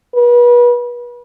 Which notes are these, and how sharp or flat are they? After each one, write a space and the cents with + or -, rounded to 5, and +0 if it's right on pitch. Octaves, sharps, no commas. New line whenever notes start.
B4 -35